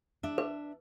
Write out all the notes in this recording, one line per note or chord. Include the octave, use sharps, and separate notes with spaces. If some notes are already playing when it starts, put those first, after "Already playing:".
D4 E5
B4